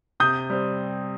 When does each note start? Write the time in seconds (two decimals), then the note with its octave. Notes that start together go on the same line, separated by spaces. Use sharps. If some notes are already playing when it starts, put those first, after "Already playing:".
0.20 C3 D#6 G6
0.50 G3 C4